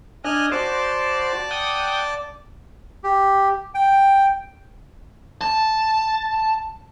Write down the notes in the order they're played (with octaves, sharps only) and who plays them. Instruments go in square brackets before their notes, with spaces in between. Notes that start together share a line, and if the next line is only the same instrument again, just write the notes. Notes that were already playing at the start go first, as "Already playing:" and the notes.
[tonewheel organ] D4 D#5 [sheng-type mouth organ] G#5 F6 F#6
[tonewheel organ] F#4 C5 [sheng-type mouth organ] D5 A5 D6
[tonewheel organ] F#5 G5 D#6
[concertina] G4
G5
[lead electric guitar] A5